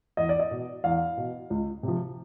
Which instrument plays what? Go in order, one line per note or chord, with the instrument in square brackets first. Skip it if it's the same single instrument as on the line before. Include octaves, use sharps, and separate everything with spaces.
[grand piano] E2 D#5
D5
D#5
B2
E2 F5
B2
C#2
C3 F3